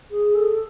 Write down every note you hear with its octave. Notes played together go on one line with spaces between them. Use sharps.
G#4
A4